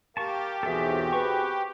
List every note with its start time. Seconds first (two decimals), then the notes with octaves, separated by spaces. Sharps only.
0.17 G4 A#4 F5 A5 C#6
0.63 B1 E2 C4 F#4 G#4 A4 E5
1.13 B4 C#6